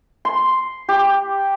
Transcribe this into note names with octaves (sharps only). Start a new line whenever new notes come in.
C6
G4